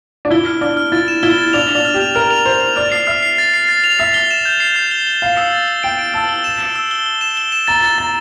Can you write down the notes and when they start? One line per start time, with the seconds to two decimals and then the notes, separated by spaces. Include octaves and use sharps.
0.25 D4
0.31 E4 G7
0.46 F6
0.61 D4 F6
0.77 F6
0.92 E4 A6
1.08 E7
1.23 E4 G7
1.38 A6
1.53 D4 F7
1.69 F7
1.75 D4
1.85 F6
1.94 G4
2.00 F7
2.15 A#4 F6
2.31 F7
2.45 C5 F7
2.61 F7
2.76 D5 F6
2.92 C7
3.07 E5 F6
3.23 C7
3.38 A6
3.54 C7
3.69 A6
3.84 F7
3.99 E5 C7
4.14 G7
4.31 E7
4.45 G6
4.60 C7
4.76 G6
4.91 G7
5.07 G7
5.22 F5 G7
5.37 E6
5.52 A6
5.68 G7
5.83 G5 D7
5.99 D7
6.14 A5 E6
6.29 G7
6.44 E7
6.60 G7
6.76 E6
6.91 G7
7.06 G7
7.21 E7
7.37 G7
7.52 E7
7.67 A#5 A6
7.82 A6
7.98 A#5 A6